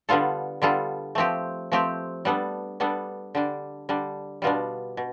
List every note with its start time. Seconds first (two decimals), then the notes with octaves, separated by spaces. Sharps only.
0.09 D3 G3 B3 F4 A4
0.62 D3 G3 B3 F4 A4
1.15 F3 A3 C4 G4
1.72 F3 A3 C4 G4
2.25 G3 B3 D4 A4
2.80 G3 B3 D4 A4
3.35 D3 G3 D4
3.89 D3 G3 D4
4.42 B2 G3 B3 D4 F4
4.97 B2